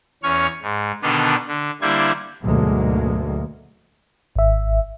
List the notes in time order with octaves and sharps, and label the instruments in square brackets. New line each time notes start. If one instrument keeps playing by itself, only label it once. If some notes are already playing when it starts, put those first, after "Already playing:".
[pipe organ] E2 C#4 C#5 C#6 F6
G#2
B2 D3 D#3 B3 D4 D#4
D3
D3 G3 A#3 E4 C5 G#6
[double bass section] D2 G#2 B2 F#3 G#3 A#3
[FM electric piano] G#1 E5